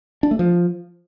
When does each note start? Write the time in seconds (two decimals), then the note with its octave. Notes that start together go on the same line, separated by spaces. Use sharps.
0.23 D4
0.31 A3
0.39 F3